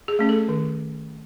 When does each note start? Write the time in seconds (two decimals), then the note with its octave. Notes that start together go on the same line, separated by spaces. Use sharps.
0.08 G#4
0.19 A3 C#4
0.29 A4
0.49 D#3